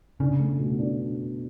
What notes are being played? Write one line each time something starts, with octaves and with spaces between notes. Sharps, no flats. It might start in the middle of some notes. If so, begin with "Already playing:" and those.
C#3 D4
A3
B2
D4